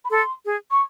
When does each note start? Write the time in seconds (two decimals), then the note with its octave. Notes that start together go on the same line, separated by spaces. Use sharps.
0.04 B5
0.10 A4 C6
0.45 G#4
0.71 C#6